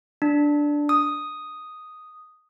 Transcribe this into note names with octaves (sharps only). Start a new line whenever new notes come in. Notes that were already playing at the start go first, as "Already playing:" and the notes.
D4
D#6